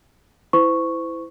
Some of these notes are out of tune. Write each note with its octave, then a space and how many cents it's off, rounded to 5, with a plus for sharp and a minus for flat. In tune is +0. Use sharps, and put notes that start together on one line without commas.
E4 +0 C5 -40 C#6 +0